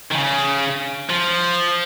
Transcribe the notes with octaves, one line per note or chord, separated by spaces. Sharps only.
D#3
C#3
F3